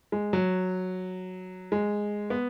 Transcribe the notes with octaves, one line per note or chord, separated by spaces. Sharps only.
G#3
F#3
G#3
B3